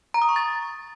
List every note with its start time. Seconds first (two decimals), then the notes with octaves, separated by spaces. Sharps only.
0.14 A#5
0.22 D#6
0.29 C#6
0.36 A6